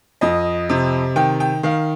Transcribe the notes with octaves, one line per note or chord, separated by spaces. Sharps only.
F2 D#5
C3
D#3 G5
G5
D#3 F5